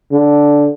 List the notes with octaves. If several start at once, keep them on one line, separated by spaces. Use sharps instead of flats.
D3